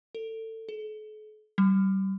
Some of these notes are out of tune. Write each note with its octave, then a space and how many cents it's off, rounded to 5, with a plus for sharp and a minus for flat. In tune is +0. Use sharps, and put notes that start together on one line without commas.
A4 +25
A4 -45
G3 -30